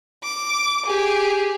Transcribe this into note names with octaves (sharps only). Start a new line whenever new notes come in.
D6
G4 G#4